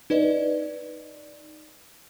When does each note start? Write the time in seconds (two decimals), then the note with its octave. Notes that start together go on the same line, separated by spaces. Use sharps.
0.10 D#4 B4 D5 D#5